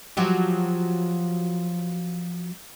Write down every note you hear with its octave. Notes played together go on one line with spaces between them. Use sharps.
F3 F#3 G4